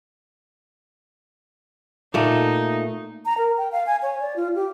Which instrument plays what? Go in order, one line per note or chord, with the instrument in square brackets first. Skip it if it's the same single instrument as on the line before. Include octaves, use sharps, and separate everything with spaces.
[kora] A#2 A3 [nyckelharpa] D#4
[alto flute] A#5
A#4
G5
F5
G#5
C#5
D5
F4
G4